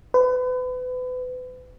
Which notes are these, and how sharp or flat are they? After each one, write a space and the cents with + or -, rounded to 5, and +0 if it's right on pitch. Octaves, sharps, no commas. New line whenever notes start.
B4 +35